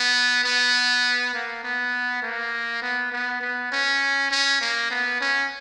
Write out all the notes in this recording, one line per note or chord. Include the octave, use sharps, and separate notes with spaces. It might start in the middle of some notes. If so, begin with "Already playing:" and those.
Already playing: B3
B3
A#3
B3
A#3
B3
B3
B3
C#4
C#4
A#3
B3
C#4